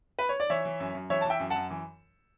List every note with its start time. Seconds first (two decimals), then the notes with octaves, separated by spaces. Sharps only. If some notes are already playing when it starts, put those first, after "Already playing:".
0.19 B4
0.29 C#5
0.40 D5
0.50 E3 C#5 E5
0.65 E3
0.80 F#2
0.95 F#2
1.10 E3 C#5 E5
1.21 E3 A5
1.30 E5 G5
1.40 F#2
1.50 F#5 A5
1.56 F#2
1.70 E3